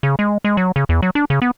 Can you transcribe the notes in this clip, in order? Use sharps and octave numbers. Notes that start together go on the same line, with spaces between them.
C#3
G#3
G#3
F#3
C#3
E2
F#3
D4
C#3
B3